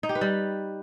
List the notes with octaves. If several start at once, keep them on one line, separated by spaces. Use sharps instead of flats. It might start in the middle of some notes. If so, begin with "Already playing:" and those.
D#4
G4
B4
G3